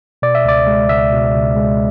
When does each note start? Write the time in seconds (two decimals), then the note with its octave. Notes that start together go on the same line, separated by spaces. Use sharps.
0.22 B2 D5
0.35 E5
0.45 C#2 D5
0.67 G#3
0.89 C#2 E5
1.12 B2
1.34 C#2
1.56 G#3